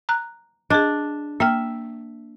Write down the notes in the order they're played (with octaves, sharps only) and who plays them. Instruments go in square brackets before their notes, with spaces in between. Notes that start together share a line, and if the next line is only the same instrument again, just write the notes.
[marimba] A#5 F#6
[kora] D4 [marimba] G#4 D#5
[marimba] A#3 G5 F6 [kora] E5